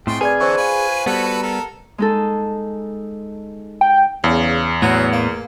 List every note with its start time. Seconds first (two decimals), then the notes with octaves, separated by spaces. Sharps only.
0.07 A2 G#3 C4 G5 C6
0.21 G#4 B4 D5 G#5 G#6
0.39 D3 E3 E4 C5 C#6 G#6
0.57 F4 B4 G#5
1.06 G3 B3 F#4 A4 B4
1.42 A4 A#4
1.98 G#3 D#4 A4
3.81 G5
4.24 E2 C#3
4.82 A2 F#3 B3
5.13 A#3